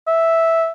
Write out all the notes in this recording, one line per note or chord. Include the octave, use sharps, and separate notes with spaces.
E5